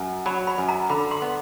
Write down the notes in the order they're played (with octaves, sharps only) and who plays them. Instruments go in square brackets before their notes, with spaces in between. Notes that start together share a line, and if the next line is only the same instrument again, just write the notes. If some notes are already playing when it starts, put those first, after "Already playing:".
Already playing: [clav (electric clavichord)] F#2
[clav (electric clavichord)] F#3 [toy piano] B5
[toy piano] B5
[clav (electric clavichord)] F#2
[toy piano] A#5
[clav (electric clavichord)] D3 [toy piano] B5
[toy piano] C6
[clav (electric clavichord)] B3